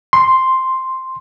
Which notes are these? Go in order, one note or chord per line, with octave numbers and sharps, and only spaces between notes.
C6